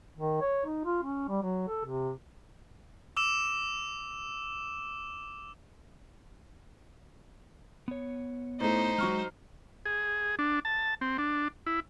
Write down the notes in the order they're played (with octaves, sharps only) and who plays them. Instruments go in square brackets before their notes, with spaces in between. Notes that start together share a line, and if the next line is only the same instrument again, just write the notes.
[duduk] D#3
C#5
D#4
F4
C#4
G3
F#3
A4
C3
[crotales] D6 E6 E7
[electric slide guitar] B3 C#5
[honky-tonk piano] A2 A3 [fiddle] D#4 C5
[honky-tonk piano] F#3 C#6 F6 [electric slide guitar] G#3
[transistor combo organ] G#4
D4
A5
C4
D4
E4